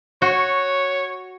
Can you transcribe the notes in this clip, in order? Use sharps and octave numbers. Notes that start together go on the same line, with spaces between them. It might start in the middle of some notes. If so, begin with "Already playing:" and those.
F#4 C#5